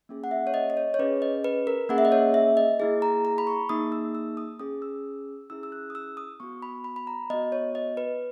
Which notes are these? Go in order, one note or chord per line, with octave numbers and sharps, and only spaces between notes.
A#3 C#4 G#4
F#5
E5
C#5
D#5
D#5
C#5
C#5
C#4 G#4 B4
D#5
B4
A#4
A#3 C#4 G#4 F#5
E5
D#5
C#5
E5
D#5
A#3 E4 G#4
A#5
A#5
B5
C#6
A#3 D#4 G#4 D#6
E6
E6
D#6
C#4 G#4 D#6
E6
C#4 E4 G#4 E6
E6
F#6
D#6
E6
D#6
B3 F#4 C#6
B5
B5
B5
A#5
B3 F#4 D#5
C#5
D#5
B4